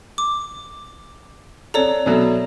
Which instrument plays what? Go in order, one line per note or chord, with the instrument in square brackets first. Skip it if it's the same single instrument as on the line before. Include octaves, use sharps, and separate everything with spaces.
[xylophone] D6
[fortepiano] F2 A4 [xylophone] C#5 D5 A#5
[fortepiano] B2 F#3 A3